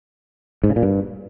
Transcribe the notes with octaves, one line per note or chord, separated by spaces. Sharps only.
G#2
C#3
A#2
G2